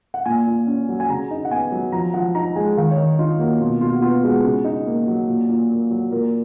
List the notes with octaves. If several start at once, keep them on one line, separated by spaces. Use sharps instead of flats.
F#5
A#2 G#5
A#2
C#4
F#3
G#5
C#3 A#5
D#4
F#5
B3 G#5
F#3
F3 A#5
F3 F#5
D#4 A#5
G#3 G#5
D#3 F5
C#5
D#3 D#5
D#4 F4
A#3 F#4
B2 F4
B2 F4
F#4
B3 F4
G#3 F#4
C#3
D#4
A#3
F#3
A#2
A#2
A#3
F#3
A#2 A#4